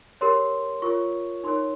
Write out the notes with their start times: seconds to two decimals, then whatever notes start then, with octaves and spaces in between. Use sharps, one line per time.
0.21 G4 A#4 C#5 C6
0.82 F4 A#4 C#5 C#6
1.44 D#4 A#4 C#5 C6